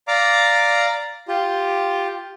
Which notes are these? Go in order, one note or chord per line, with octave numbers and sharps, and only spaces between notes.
D5 F5 A#5 D6
F4 G4